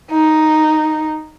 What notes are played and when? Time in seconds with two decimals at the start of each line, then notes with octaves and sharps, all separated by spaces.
0.11 D#4